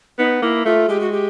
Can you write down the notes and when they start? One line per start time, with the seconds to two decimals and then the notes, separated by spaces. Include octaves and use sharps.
0.19 B3 D#4
0.42 A#3 E4
0.66 A3 F4
0.89 G#3 G4
1.01 F#4
1.12 G4